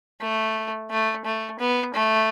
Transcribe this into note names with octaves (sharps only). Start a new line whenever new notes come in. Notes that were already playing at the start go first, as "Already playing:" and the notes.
A3
A3
A3
B3
A3